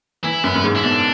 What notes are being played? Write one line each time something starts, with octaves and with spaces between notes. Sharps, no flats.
E3 E4
F#2 B3
F#2
G#2
E4
B2 D4